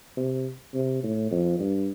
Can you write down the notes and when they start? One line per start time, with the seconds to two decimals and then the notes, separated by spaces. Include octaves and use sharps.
0.17 C3
0.74 C3
1.03 A2
1.31 F2
1.59 G2